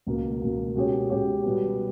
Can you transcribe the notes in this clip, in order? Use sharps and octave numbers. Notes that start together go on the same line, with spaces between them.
C#2 B2 A#3
C#2 B2 A#3
B2 G#3 C#4 G4 C#5
B2 G#3 C#4 G4 C#5
B2 G3 B3 G4